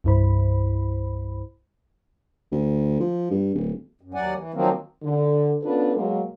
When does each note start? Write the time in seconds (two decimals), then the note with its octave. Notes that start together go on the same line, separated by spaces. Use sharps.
0.04 C2 G2 E4 C5 B5
2.52 D2
3.00 F3
3.31 G2
3.55 D1
4.01 F#2
4.14 D#2 F#3 D5 F#5 G#5
4.35 E3
4.54 D#3 F3 F#3 A#3 C4
5.03 D3
5.63 B3 C#4 D4 F4 A4 B4
5.95 B2 F#3 G#3 A#3